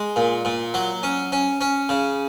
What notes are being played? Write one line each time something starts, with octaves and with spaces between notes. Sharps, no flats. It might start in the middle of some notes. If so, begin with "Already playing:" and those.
Already playing: G#3
A#2
A#2
F#3
C#4
C#4
C#4
C#3